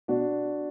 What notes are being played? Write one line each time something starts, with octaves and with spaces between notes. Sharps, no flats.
B2 D4 F#4